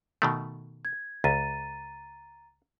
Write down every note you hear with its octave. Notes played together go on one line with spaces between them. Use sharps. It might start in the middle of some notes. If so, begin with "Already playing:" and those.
B2 D#3 A3
G#6
C#2 A#5 A6 D#7